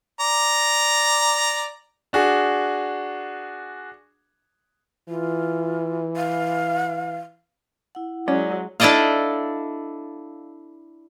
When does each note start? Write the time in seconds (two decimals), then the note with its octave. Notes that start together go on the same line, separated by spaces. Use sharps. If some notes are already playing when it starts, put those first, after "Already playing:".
0.20 D5 A#5
2.13 D4 F#4 G#4
5.09 E3 F4
6.17 F5
7.95 E4 F#5
8.28 F#3 G#3 C#4 D5
8.80 D4 E4 A4 D5 D#5 F5